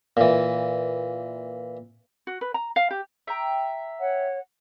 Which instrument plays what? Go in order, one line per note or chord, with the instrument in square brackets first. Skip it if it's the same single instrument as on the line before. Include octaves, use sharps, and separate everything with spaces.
[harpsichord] A#2 E3
[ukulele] F#4
B4
A#5
F5
G4
[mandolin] E5 G5 A#5
[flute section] C#5 F#5